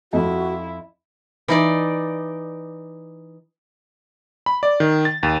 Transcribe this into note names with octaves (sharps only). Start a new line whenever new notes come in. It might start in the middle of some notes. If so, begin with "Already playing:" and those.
F2 E4 F#4
E3 D#4 D5
B5
D5
D#3
A6
D#2